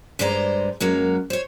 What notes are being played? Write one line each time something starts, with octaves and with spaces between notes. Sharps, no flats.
G2 G#3 C5 D5 A#5
F#2 F#3 G#3 A#3
C5 C#5